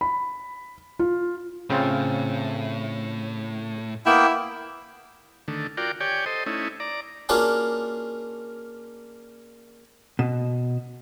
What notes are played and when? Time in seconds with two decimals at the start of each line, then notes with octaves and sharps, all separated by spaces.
0.01 B5
0.99 F4
1.70 A2 C#3 C4 F4
4.06 A#3 B3 E4 G5
5.48 D3 D#3 A3
5.77 F4 F#4 A#4 D5 G5
6.00 G4 C#5 D5 G5 G#5
6.26 A4 C5 D#5
6.46 A3 C#4 D#4 E4
6.80 D5 A#5
7.29 A#3 C#4 D4 F4 F#4 G#4
10.19 B2